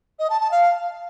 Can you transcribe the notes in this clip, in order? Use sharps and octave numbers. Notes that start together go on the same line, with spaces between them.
D#5
A5
A5
F5